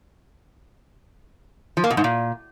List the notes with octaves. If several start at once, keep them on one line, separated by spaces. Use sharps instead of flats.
F3
A#3
B2
G#2
A#2